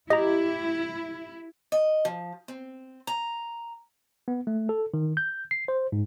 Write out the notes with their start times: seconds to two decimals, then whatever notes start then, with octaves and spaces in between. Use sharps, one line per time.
0.10 E4 G4 D#5 A#5
1.72 D#5
2.05 F3
2.48 C4
3.07 A#5
4.28 B3
4.47 A3
4.69 A4
4.94 D#3
5.17 G6
5.51 C7
5.68 C5
5.92 G#2